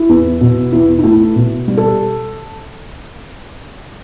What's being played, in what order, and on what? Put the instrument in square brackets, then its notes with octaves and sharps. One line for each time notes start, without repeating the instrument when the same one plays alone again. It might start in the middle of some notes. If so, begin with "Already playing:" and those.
Already playing: [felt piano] E4
E2
B2
E2 E4
D#4
A3 E4
B2
G3
A4